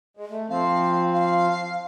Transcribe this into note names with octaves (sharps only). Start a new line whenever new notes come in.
G#3
A3
F3 C4 F5
F5